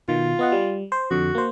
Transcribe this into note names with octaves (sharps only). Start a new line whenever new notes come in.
B2 D#3 F4
B3 D#5 F#5
G3
C5
F2 D3 F#4
A#3 C5